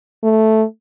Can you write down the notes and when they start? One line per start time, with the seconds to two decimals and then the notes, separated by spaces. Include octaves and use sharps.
0.24 A3